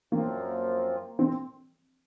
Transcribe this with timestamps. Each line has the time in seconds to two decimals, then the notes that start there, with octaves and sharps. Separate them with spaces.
0.12 F#2 F3 A#3 C4 F4
1.19 C4